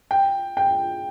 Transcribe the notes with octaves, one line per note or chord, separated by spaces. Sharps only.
G5
G5